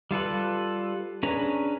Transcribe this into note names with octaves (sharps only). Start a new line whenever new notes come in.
G3 F4 A4 B4
C#4 D4 G#4 B4 A#5